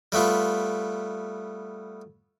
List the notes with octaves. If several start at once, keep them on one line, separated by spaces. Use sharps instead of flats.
G3 A3 B3 F4